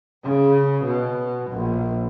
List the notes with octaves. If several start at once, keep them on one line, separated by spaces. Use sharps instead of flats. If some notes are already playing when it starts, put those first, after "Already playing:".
C#3
B2
A#1